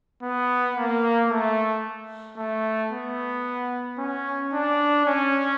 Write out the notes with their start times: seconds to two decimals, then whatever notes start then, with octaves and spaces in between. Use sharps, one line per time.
0.22 B3
0.76 A#3
1.30 A3
2.37 A3
2.91 B3
3.98 C#4
4.53 D4
5.06 C#4